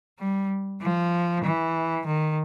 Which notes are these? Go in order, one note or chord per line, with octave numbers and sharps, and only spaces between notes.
G3
F3
E3
D#3